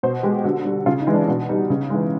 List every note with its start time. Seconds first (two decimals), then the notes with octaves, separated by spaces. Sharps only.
0.03 B2 C5
0.23 G#3 G4
0.44 D3 F#4
0.65 G3
0.86 C#3 F4
1.00 D#4
1.07 E3 G#3
1.14 D4
1.28 B2 D4
1.49 G3 D#4
1.70 C#3
1.90 E3 G#3